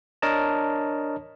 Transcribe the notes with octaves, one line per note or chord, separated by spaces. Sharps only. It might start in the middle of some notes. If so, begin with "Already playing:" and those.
D4 A#4 C#5 D#5 A5